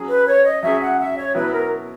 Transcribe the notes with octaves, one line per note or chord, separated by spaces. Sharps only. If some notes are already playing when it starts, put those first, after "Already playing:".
Already playing: F#3 C#4 G#4
B4
C#5
D#5
F#3 C#4 G#4 E5
F#5
E5
C#5
B2 F#3 B3 E4 B4
A#4